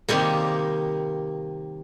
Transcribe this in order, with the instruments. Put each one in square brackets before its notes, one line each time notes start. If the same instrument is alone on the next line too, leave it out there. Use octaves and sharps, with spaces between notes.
[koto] C3 D#3 G3 A#3